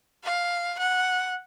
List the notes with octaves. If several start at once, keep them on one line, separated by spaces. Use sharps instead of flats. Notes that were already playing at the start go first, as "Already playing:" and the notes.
F5
F#5